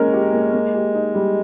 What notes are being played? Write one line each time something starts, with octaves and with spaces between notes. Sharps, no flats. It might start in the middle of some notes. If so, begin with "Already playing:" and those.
Already playing: G#3 A#3 C#4 A#4
G4
A#3
A#3
G4
D#4
G3